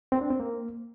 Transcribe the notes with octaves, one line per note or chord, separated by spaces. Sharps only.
C4
D4
C4
A#3